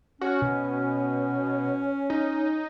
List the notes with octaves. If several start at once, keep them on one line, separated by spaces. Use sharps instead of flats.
C#4 F#4
B2
D#4